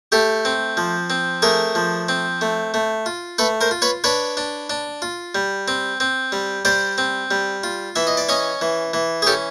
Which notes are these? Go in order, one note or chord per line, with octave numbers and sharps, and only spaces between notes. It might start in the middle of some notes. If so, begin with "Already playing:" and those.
A3 G4 A4
C4
F3
C4
A3 G#4 A#4
F3
C4
A3
A3
F4
A3 A4 B4
A#4 C5
F4
B4 C#5
D4 B4 C#5
D4
D4
F4
G3
C4
C4
G3
G3 C5 D5
C4
G3
F4
E3 E5
D#5
D5
C#4 C#5 D#5
E3
E3
G#4
C#4 G4 A4